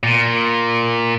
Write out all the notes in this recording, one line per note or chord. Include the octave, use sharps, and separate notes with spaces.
A#2